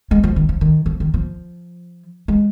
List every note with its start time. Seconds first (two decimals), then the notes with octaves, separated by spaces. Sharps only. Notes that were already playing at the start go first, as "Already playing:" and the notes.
0.11 G#3
0.24 F3
0.36 D#3
0.49 F3
0.61 D#3
0.86 F3
1.00 D#3
1.14 F3
2.28 G#3